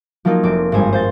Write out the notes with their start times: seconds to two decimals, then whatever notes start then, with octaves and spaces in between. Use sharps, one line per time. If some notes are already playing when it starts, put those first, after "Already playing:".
0.25 F3 F#3 A#3 D#4 F4
0.43 F1 C4 D6
0.72 G#1 G2 C5 G#5
0.93 C5 G6 A6